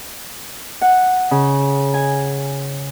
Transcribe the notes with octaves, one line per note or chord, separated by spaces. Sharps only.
F#5
C#3
G#5